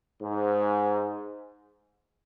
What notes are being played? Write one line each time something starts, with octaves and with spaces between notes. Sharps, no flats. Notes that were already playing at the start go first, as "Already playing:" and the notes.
G#2